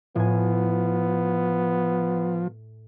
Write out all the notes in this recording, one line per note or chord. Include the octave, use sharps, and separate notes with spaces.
A2 F3 B3 G#5